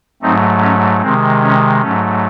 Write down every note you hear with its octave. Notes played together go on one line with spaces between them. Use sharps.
G#2 F#3 A3 C4 D#4
C#4
C3 D#3 G#3 C4
C#4
G#2 F#3 A3 C#4